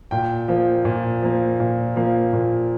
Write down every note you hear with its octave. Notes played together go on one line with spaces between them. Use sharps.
A#2 G5
F3 A#3
A#2
F3 A#3
A#2
F3 A#3
A#2